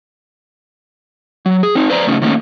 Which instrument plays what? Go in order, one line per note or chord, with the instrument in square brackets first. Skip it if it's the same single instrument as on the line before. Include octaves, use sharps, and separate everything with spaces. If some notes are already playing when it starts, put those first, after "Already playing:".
[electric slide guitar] F#3
G#4
C4 D#4
B4 C5 D5 A#5
G2 C#3 A3 C#4 D#4
D#3 A3 A#3 C#4 D#4